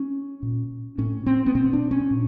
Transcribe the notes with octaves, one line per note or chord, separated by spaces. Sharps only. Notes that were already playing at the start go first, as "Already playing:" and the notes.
Already playing: C#4
A#2
A2 C#4
C4
B3
B2 C4
D4
C#4
A#2